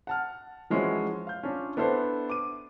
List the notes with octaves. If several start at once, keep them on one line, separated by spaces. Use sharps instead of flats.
F#5 A5 F6
E3 F3 G#3 C#4 E4 F#4
F5 G6
C#4 D4 F4
B3 D4 E4 A4 C5
D6 D#7